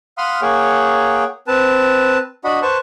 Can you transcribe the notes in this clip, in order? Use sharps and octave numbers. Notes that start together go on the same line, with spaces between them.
F5 F#5 B5 C6 D#6 F6
A#3 G#4 C#5 F#5 G5
C4 B4 A5
D4 F#4 D#5 F#5 B5
B4 C5 A5 C#6